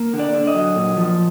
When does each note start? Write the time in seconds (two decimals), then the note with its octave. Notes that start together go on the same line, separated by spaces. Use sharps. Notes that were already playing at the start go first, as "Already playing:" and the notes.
Already playing: A#3
0.13 D3
0.19 D5
0.34 D3
0.47 D#5
0.55 F#3
0.76 A#2
0.97 F3